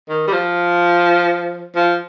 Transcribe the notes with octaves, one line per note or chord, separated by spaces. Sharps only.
D#3
G3
F3
F3